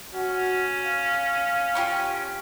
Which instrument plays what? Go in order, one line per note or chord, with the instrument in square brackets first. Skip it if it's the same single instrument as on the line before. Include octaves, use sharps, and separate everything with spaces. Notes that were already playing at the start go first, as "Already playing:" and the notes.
[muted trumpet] C#4 [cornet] F#4
[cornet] F5
[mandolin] F4 G4 C#6